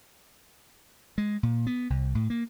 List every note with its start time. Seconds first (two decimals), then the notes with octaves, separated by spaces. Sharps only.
1.18 G#3
1.43 A#2
1.67 B3
1.90 C2
2.15 A2
2.30 A#3